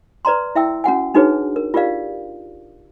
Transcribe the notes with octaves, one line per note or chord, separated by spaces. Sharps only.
B4 D5 A#5 C6
E4 E5 G5 E6
C#4 F#4 F#5 G#5
D4 D#4 F#4 G#4 B4 C#5
A#4
F4 G4 A#4 D5 F5